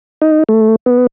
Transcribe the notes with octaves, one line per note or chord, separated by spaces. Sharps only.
D#4
A3
B3